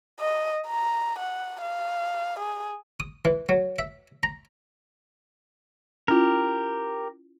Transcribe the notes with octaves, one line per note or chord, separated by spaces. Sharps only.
D#5
A#5
F#5
F5
G#4
D#6
E3
F#3
E5
A#5
C#4 E4 F4 G4 A#4